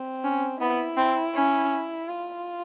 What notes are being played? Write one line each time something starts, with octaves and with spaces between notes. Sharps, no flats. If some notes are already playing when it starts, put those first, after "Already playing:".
Already playing: C4
C#4
B3 E4
C4
C#4
F4